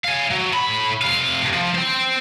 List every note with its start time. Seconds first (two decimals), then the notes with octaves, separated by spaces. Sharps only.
0.04 F5 G#5
0.31 F#3
0.54 A2 B5
1.02 C3 F5
1.53 F3
1.75 C5 G5